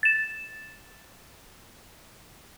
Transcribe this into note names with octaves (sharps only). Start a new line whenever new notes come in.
A6 E7